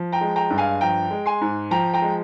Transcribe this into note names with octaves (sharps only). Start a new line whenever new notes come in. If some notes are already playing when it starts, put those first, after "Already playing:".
Already playing: F3
G5 A#5
G#3
G5 A#5
G2
F5 G#5
F3 G5 A#5
G#3
G#5 C6
G#2
F3 G5 A#5
G5 A#5
G#3